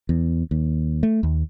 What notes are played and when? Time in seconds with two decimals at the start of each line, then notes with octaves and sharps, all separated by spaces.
0.09 E2
0.51 D#2
1.03 A3
1.23 D#2